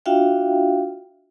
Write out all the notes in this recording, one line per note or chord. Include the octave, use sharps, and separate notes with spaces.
D4 F4 F#4 E5 F5 G5